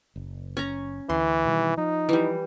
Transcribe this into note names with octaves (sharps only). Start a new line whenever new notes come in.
F#1
C#4 A#5
D2 E3 C6
B2 D#3 G3
F3 D#4
E3 G3